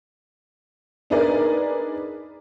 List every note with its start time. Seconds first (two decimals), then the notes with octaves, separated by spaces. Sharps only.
1.10 D4 D#4 G#4 A#4 B4 D5